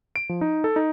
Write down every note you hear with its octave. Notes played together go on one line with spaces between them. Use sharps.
D7
F3
D#4
A4
D#4